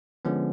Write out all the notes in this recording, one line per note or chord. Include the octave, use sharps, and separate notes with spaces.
D3 F3 G#3 B3 C#4